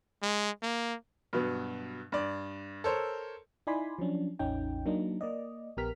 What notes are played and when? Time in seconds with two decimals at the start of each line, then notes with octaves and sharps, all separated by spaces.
0.23 G#3
0.63 A#3
1.33 G2 B2 F#3 B3
2.12 G2 D5
2.84 A4 A#4 C5 C#5
3.67 D#4 E4 D5 G#5 B5 C6
3.99 F3 F#3 C#4 D4
4.39 A1 E2 C#4 D#4 G5
4.86 F#3 A#3 D4 D#4
5.21 A#3 D5 D#5
5.77 A#1 B3 G4 A#4 F6 B6